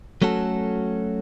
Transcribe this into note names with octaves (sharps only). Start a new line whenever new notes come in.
F#3 A3 C#4 F#4 A4